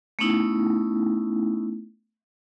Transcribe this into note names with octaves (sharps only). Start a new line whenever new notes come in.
A3 B3 C#4 D#4 E4